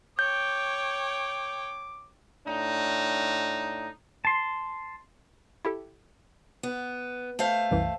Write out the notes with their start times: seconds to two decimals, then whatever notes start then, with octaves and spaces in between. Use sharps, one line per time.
0.19 C#5 G5 D6 G6
2.47 A2 D4 D#4
4.25 A5 C6
5.65 E4 G4 A4
6.63 B3
7.39 A3 C5 F5
7.71 C2 F#2 E3